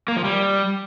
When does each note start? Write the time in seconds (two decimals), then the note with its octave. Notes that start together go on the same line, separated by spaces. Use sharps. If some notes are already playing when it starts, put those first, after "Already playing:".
0.08 A#3
0.17 F3
0.25 G3